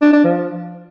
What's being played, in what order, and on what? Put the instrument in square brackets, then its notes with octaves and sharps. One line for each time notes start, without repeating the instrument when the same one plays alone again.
[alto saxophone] D4
D4
F3